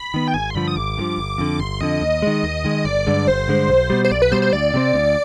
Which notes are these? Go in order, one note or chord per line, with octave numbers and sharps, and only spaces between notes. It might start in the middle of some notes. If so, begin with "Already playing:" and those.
Already playing: B5
D#3 B3
G5
G#1 G#5
C6
G2 D3 F3 B5
D#6
G#1 D6
G2 D3 F3
G1
F2 D3
G1 C6
F2 D3 D#5
D#2
D#3 G#3
D#2
D#3 G#3
G1 D5
G2 D3 G#3
G1 C5
G2 D3 G#3
B1
B2 G3
C5
B1 D5
B4
B2 G3 C5
C5
D2 D5
C3 G3 C4
D2